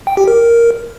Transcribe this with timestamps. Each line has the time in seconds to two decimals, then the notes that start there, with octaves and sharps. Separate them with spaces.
0.07 G5
0.17 G4
0.28 A#4